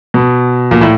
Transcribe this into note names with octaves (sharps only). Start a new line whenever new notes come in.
B2
A#2
A2